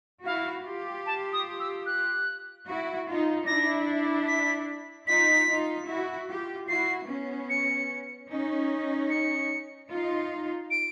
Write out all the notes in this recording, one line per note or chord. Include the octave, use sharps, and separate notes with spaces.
E4 F#4 F5
F4 G4
A5
D#6
E6
F#6
E4 F#4
D#4 F4
D4 E4 A#6
B6
D#4 F4 B6
D#4 F4
E4 F#4
F4 G4
E4 F#4 C7
B3 C#4
C#7
C#4 D#4
C#7
D#4 F4
D7